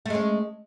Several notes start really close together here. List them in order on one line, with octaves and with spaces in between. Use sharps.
A3 G#3 C#4